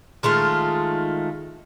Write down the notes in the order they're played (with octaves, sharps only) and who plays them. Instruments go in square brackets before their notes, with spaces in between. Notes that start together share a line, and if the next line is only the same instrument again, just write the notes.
[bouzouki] D#3 G#3 A3 F4